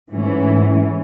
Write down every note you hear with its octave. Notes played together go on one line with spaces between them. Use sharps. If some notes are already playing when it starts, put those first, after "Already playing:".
G#2 E3 A3 C#4